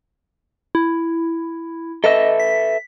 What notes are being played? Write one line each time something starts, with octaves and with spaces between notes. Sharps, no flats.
E4
A4 B4 D#5 E5
B6